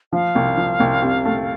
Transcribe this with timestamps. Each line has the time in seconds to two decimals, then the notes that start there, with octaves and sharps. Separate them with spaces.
0.13 F3 F5
0.35 C2
0.57 F3
0.80 C2
1.02 C3
1.25 A3